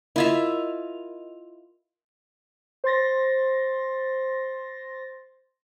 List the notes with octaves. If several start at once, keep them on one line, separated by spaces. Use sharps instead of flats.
E4 F4 A#4 D#5 E5 F7
C5 C6 A6 A#6